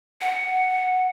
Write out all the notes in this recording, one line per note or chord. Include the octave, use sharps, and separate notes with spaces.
F#5